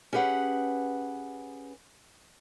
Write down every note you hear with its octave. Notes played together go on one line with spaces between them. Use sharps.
C#4 G4 G#4 B4 F#5